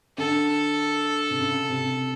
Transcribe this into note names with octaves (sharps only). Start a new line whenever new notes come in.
D3 A4
C3
C#3
C3